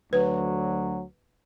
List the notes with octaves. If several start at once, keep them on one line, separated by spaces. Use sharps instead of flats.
D2 F#3 B4